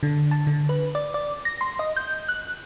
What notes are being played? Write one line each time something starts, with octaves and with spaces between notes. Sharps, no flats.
D3
A5
D3
B4
D5
D5
A#6
C6
D#5
G6
F#6